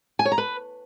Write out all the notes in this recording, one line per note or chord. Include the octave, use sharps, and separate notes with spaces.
G#5
C#5
A#5
B4